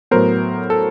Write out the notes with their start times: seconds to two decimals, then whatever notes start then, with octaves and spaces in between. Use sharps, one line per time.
0.11 A2 F#3 B3 A#4 C5
0.70 A4